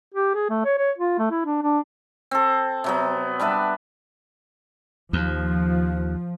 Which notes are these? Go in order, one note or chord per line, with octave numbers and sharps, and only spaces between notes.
G4
G#4
A3
C#5
C#5
F4
A3
E4
D4
D4
C4 A4
C3 F#3 B3
G3 D4 B4 E5
D#2 F3